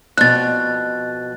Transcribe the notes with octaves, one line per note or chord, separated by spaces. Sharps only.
F2 B2 F#6 A6